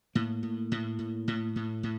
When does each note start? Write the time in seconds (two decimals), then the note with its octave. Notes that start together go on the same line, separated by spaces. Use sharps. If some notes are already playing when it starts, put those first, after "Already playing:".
0.15 A2 A#3
0.43 A2
0.72 A2
0.99 A2
1.28 A2
1.56 A2
1.83 A2